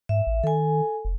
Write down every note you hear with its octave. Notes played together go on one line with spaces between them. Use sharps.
G#2 E5
A1
D#3 A4 G#5
F1